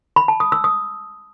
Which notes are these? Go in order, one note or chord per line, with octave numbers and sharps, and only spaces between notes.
B5
A5
D#6
E6
D#6